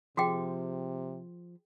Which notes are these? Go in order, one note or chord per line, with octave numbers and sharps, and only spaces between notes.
C3 F3 F#4 G#4 G5